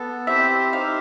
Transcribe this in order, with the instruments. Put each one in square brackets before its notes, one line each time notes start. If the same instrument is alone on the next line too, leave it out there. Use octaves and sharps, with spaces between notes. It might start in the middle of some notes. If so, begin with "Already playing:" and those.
Already playing: [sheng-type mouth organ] B3 A4
[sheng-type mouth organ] C4 E4 G4 C5 [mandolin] E5
[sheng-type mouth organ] D#4 G4 C5 E5 [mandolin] F5